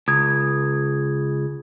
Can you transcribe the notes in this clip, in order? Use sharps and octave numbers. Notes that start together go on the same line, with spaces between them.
C#2 D#6 G#6